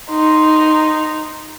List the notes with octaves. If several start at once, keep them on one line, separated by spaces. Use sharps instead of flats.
D#4 C6